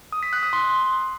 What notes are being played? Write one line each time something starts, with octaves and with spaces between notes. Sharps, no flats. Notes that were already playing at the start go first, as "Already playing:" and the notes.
D#6
B6
F#6
D#6
C6